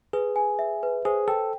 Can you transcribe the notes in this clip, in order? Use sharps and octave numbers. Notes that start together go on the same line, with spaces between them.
G#4 B4
G#5
E5
B4
G#4 C5
A4 G5